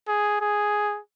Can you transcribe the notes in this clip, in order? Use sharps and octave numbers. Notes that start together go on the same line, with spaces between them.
G#4
G#4